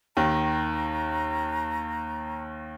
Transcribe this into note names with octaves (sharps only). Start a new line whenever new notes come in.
D#2 D#3 A#5